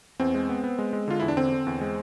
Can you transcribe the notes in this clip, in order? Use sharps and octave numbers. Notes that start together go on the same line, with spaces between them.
E2 C4
G#3
B3
B3
G#3
G#3
D3 F4
E2 E4
D4
D3 C4
D3
E2
G#3